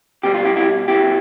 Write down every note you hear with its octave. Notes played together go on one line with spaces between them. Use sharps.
B2 G3 G4
F4
E4 G4
E4 G4
B2 G3 E4 G4